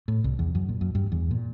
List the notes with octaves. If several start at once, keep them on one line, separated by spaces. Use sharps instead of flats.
A2
C2
E2
F#2
A#2
F#2
G2
E2
A#2